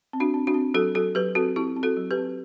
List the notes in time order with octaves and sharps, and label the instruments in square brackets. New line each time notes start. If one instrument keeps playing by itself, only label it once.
[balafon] C4
D4 F#4
C4
D4 F#4
C4
F#3 F#4 A4
F#3 F#4 A4
F#3 G4 B4
C4 F#4 A4
C4 E4 G4
C4
F#4 A4
F#3
G4 B4
C4